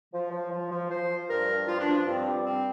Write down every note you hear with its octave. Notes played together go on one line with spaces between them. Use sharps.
F3
F3
F3
F3
F3 C5
F3
G2 A#4
G2
F3 F4
D4
F3
F4
G2 C4
G3
G2 C4